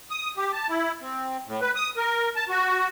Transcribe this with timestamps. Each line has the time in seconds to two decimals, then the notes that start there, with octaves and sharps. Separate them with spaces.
0.10 D#6
0.37 G4
0.52 A5
0.69 E4
1.01 C4
1.46 A2
1.62 B4
1.75 D#6
1.97 A#4
2.36 A5
2.49 F#4